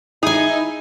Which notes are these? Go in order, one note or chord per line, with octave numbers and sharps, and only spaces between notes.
D#4 E4 G#4 G#5